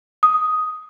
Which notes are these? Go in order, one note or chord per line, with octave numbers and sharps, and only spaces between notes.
D#6